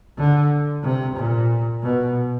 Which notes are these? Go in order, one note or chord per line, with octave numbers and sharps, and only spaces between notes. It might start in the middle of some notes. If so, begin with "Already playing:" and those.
D3
C3
A#2
B2